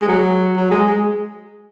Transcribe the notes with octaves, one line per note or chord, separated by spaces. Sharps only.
G#3
F#3
F#3
G#3
G#3